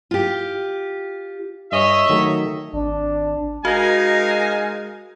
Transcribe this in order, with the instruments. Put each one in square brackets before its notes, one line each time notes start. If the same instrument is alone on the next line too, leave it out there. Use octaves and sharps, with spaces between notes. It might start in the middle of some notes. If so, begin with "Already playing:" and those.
[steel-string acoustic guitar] F4 G4
[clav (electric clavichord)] G2 [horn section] C#5 D#5 E5
[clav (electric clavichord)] D#3 F#3 A3
[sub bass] G#1 [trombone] D4
[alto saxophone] G#3 [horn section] D#4 F5 G#5 [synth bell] F#4 [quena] A#4